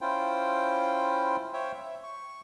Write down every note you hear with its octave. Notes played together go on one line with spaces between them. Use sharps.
C#4 E4 F4 C5 G5
C5 C#5 E5 G5
E5
C#6